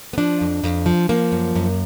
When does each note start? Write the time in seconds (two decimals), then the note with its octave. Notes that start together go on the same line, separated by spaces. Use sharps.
0.13 B3
0.18 F3 D4
0.41 F2
0.64 F2
0.86 F3
1.09 F3 A#3
1.32 F#2
1.56 F#2